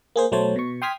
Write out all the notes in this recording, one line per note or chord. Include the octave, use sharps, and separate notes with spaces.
A#3 G#4 C5
B1 F#3 A3 C5 C#5 A5
B2 C#6
G5 C6 D#6 F6 G#6 B6